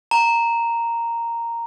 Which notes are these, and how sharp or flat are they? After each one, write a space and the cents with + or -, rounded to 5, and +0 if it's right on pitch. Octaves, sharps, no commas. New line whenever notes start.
A#5 -5